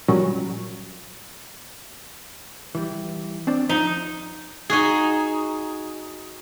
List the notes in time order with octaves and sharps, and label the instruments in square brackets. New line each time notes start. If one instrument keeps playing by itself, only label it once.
[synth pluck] A#2 F#3 G3 C#4
[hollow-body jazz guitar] E3 G3
C4 D4 D5
[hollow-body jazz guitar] F3 [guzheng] D#4
[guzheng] D#4 F#4 G#4